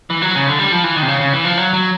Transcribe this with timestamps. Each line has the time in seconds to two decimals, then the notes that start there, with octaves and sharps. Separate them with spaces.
0.10 E3
0.22 F#3
0.35 C#3
0.47 D3
0.59 G3
0.72 F3
0.84 E3
0.96 D#3
1.02 C3
1.08 C#3
1.20 C#3
1.33 E3
1.45 F3
1.57 F#3
1.73 F#3